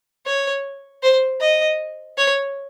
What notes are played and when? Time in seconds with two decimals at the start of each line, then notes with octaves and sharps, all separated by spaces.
0.26 C#5
1.03 C5
1.41 D#5
2.18 C#5